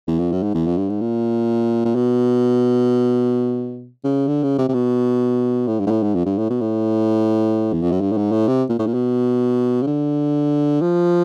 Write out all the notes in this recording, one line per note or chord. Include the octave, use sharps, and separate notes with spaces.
E2
F2
F#2
G#2
E2
F2
G2
G#2
A#2
A#2
B2
C#3
D3
C#3
C3
C3
B2
A2
G2
G#2
A2
G#2
F2
G2
A2
B2
A2
E2
F2
F#2
G2
A2
G#2
A2
C3
A#2
A2
A#2
B2
C#3
D3
F3